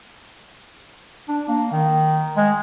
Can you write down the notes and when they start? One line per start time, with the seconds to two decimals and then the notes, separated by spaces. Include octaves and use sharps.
1.28 D4
1.48 A#3
1.72 D#3
2.37 G#3